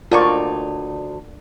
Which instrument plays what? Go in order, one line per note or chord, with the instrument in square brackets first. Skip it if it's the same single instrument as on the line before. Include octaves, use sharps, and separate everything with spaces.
[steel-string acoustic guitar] D2 [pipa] C#3 D#4 C#6 [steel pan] F4 A#4 D5